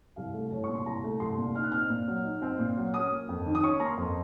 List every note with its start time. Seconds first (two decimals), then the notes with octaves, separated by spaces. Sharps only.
0.16 C2 F5
0.34 A3
0.51 C2 C#5
0.64 C#6
0.69 A#2
0.75 C6
0.86 C2 A#5
1.04 A3
1.20 C2 C6
1.38 A#2
1.56 D#4 F6
1.63 F#6
1.72 C4 F6
1.90 A#2
2.08 F#3
2.24 D#4
2.42 C4
2.59 A#2
2.77 F#3
2.94 C#4 D#6
3.12 A#3
3.29 F2
3.46 D#3
3.55 D#6
3.63 C#4 C#6
3.80 A#3 A#5
3.86 C6
3.97 F2